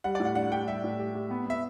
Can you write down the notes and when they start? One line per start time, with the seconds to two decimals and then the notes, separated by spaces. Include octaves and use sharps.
0.04 G3 F#5
0.15 A2 D5
0.25 F#5
0.35 D4 F#5
0.52 G4 G5
0.67 G3 E5
0.84 A2
0.99 G4
1.15 G4
1.31 B3
1.46 B3 E5